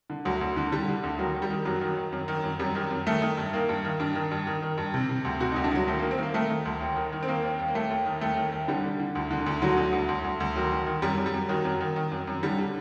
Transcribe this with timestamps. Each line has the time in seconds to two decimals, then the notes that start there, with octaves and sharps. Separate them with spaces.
0.10 D3
0.25 D2 F#3
0.41 D2
0.56 D3
0.72 D3 G3
0.88 D3
1.03 D2
1.19 D#3 F#3
1.35 D#3
1.42 G3
1.50 D#3
1.65 F#2 F#3
1.81 D#3
1.97 D#3
2.12 F#2
2.28 D#3
2.44 F#2
2.60 F#2 G3
2.75 D#3
2.90 F#2
3.06 D#3 A3
3.22 D#3
3.37 G2
3.53 D#3 A#3
3.69 G2
3.85 D#3
4.00 G2 D4
4.15 D#3
4.31 G2
4.47 D#3
4.62 D#3
4.78 G2
4.94 C3
5.09 C3
5.25 D2
5.40 C3 F#4
5.52 D#4
5.56 D2
5.64 D4
5.71 D2 F#3
5.87 D#3 A3
5.99 A#3
6.03 D#3
6.11 C4
6.18 D#3 A#3
6.34 D#3 A3
6.50 D#3
6.65 D2
6.81 D#2
6.96 D#3
7.13 D#3
7.22 C4
7.28 D#3 A#3
7.43 D#2
7.59 D#2
7.68 A#3
7.75 D#2 A3
7.91 D#2
8.06 D#3
8.21 D#2 A3
8.36 D#3
8.52 D#2
8.68 D3 G3
8.84 D3
8.99 D3
9.15 D2
9.31 D3
9.46 D2
9.62 D3 F#3
9.78 D2
9.93 D2
10.09 D2
10.24 D2
10.40 D2
10.56 D#3 F#3
10.71 D#3
10.86 D#3
11.02 F#2 G3
11.18 F#2
11.26 G3
11.34 F#2
11.49 D#3 F#3
11.65 F#2
11.81 D#3
11.96 D#3
12.12 F#2
12.27 F#2
12.43 D3 G3
12.58 D3